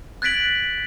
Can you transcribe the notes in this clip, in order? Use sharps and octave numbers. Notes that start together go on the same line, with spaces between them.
F#6 G#6 A6 B6 D7 F#7